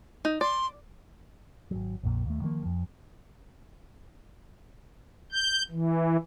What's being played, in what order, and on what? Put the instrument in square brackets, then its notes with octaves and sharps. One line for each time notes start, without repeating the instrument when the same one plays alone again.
[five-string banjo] D#4
[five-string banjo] D5 [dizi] C6
[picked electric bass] G#1 F#3
A#1 F2 A#2
D#2 A3
D#3 F3 G3 A#3
F2 F3
[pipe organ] G6
E3